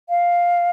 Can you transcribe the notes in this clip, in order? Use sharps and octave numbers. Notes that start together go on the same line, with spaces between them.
F5